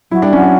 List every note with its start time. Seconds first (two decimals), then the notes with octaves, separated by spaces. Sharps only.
0.11 F#3 E4
0.22 G3 D4
0.33 F#3 C#4
0.43 D4